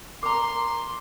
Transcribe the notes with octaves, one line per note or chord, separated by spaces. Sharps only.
A#4 A#5 C6 D6